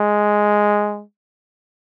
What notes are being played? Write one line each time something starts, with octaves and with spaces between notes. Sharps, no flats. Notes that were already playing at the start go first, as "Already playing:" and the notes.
Already playing: G#3